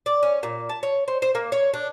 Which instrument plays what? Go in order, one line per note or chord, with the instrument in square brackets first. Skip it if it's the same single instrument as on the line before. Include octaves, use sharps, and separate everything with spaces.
[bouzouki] D5
C#4
A#2
A5
C#5
C5
C5
A#3
C#5
D4